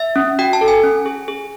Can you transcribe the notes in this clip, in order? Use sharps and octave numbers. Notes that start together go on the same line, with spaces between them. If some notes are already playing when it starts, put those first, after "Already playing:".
Already playing: E5
C#4
F#4 G5
A5
A4
G#5
C#4
G#4
G#4